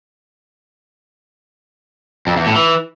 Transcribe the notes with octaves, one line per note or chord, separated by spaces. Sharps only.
F2
E2
A2
E3